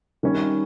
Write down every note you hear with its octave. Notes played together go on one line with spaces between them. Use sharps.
D#3 G3 C#4